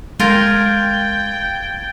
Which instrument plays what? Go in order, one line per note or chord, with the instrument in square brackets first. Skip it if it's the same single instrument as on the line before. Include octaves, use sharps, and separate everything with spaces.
[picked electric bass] G#3 [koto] F4 A#4 [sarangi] G5 [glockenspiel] G#6 A6 G7